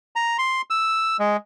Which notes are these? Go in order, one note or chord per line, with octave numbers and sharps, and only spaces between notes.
A#5
C6
E6
G#3